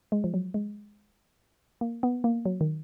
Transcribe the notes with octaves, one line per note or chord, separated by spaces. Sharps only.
G#3
F3
F#3
G#3
A#3
B3
A#3
F#3
D#3